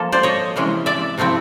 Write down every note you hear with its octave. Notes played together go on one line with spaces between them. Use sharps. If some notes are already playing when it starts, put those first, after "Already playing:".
Already playing: F3 A#3 A4
C5 D5
C#5 D#5
C3 E3 G#3 C#4 E4
D5 E5
C3 F3 A3 C4 E4